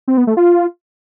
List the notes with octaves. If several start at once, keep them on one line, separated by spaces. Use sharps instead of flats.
C4
B3
A3
F4